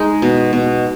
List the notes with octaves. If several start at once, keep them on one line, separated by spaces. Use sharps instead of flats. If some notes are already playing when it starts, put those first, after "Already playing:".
Already playing: G#3 D#4
B2
B2